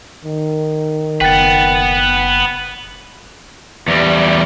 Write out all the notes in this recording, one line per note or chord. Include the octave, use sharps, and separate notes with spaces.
D#3
F#1 B4 F#5 G5 A6
E2 G3